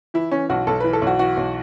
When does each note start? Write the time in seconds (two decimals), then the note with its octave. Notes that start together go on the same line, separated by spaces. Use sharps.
0.14 E3 E4
0.32 E3 C#4
0.49 B1 F#4
0.67 B1 A4
0.80 E3 B4
0.93 A4
1.02 B1
1.07 F#4
1.19 E3 F#4
1.37 B1